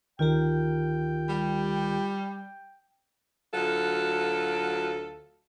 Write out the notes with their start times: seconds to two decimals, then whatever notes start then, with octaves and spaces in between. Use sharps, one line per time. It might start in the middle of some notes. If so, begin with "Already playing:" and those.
0.19 D2 D#3 F4 G4 A#4 G5
1.29 G3
3.54 D2 F#3 F4 A4